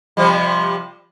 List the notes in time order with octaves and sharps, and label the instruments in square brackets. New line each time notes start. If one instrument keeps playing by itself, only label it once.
[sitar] C3 F3 G3